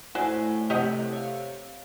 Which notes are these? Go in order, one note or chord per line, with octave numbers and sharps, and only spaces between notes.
A2 A3 E4 F#4 C5 D5 G#5
C3 G4 D#5 F#5
C#5 F5